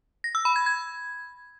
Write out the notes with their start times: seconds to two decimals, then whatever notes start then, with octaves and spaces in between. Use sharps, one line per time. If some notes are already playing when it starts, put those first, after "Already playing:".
0.24 A#6
0.35 E6
0.45 B5
0.56 G#6
0.66 G#6